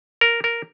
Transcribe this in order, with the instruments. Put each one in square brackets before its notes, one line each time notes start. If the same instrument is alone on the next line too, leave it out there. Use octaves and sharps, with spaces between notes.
[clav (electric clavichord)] A#4
A#4